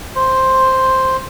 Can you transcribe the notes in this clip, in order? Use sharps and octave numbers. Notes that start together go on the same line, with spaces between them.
C5